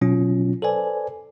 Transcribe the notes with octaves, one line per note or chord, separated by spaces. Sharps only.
B2 F#3 C#4 F4
A4 B4 C5 D5 G#5